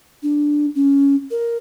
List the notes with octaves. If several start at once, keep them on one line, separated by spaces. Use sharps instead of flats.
D4
C#4
A#4